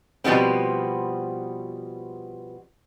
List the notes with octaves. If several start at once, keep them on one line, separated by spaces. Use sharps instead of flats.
B2 F3 G3 B3 C4